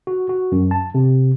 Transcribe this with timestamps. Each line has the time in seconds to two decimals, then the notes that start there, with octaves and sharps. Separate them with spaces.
0.07 F#4
0.29 F#4
0.52 F#2
0.71 A5
0.94 C3